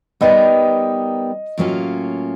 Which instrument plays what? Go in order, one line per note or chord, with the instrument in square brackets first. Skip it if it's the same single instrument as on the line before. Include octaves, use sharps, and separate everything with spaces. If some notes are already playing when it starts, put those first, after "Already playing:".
[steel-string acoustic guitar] G3 B3 D#4 G4 A#4 [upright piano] D#5
[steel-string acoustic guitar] A2 F#3 A#3 C#4 F4